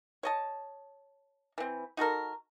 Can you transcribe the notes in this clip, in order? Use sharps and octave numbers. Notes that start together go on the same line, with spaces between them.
C#5 D#5 A5
E3 C4
D#4 F#4 A4 A#4